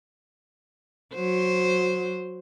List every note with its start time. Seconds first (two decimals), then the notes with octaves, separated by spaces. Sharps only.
1.14 F#3 C5